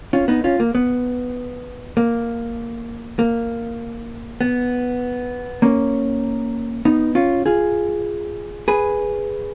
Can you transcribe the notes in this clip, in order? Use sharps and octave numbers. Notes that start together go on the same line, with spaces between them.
C#4 F4
B3 D#4
C#4 F4
A#3
B3
A#3
A#3
B3
A#3 C#4
B3 D#4
C#4 F4
F4 G#4
G#4 B4